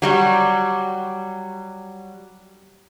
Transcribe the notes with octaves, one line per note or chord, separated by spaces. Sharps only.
F#3 G3 F#4